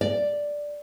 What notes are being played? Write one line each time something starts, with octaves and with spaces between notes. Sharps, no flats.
D5